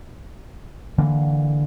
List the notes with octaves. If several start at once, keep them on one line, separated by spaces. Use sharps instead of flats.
D3 E3 A#3